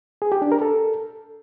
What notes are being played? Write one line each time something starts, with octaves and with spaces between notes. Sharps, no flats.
G#4
G4
D4
A#4
A4